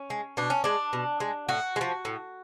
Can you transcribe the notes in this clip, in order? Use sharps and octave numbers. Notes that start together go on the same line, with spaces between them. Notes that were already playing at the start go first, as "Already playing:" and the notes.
Already playing: C#4
G#3
B2 D4
C#4
G#3 D4
B2
G#3
A2 F#4
G#3
F3
A2